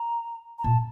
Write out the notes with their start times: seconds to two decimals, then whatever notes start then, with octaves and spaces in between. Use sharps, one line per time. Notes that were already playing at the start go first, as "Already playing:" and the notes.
Already playing: A#5
0.59 A#5
0.64 A#2 A5